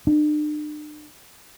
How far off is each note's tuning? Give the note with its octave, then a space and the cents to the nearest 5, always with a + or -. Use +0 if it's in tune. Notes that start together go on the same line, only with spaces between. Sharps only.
D4 +45